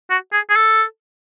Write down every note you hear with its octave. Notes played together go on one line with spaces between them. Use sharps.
F#4
G#4
G#4
A4